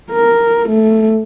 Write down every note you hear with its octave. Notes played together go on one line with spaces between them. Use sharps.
A#4
A3